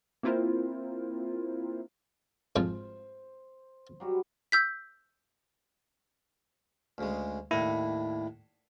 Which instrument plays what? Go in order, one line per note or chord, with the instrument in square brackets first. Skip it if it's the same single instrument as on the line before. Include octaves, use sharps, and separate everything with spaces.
[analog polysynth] A#3 C4 E4 F4 A#4 C5
[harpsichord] F2 G#2 F3 [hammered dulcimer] C5
[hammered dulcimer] F#3 G3 F#4
[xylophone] E6 G6 B6
[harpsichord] D2 C#3 G#3
[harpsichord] D#2 A2 D4 [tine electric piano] E4